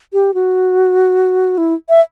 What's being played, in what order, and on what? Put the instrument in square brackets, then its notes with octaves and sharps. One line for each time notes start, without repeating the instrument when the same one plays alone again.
[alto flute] G4
F#4
E4
E5